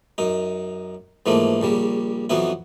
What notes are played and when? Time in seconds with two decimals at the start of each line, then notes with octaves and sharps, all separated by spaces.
0.18 F#2 D#4
1.26 G#2 E3 F3 A3 A#3
1.61 A#1 C#3 G3
2.30 F2 E3 F#3 B3 E4